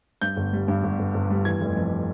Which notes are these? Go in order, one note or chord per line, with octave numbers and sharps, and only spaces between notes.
G2 G6
G1
G3
G2
G1
G1
G1
G3
E3 G#6
F1
F2